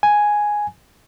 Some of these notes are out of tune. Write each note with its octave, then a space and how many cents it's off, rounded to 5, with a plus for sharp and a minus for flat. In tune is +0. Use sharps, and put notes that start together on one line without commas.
G#5 +0